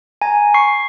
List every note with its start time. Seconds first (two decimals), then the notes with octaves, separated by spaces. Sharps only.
0.22 G#5 A#5
0.54 C#6 C7